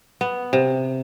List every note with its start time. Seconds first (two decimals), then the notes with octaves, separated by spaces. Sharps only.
0.21 B3
0.53 C3